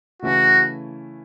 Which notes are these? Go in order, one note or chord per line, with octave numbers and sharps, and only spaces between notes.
C#3 E3 A3 C#4 E4 F#4